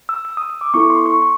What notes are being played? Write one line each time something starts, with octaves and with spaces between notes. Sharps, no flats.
E6
E6
D#6
D#6
D6
B3 E4 A4 C#6
C6
C#6
C#6